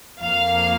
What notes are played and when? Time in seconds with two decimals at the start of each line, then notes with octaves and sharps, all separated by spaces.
0.21 F2 F3 A#3 F5